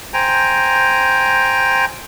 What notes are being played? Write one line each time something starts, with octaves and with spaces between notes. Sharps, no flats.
C5 G5 G#5 A#5